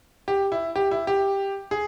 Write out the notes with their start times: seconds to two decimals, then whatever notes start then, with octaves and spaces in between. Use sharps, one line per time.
0.28 G4
0.52 E4
0.76 G4
0.91 E4
1.07 G4
1.71 G#4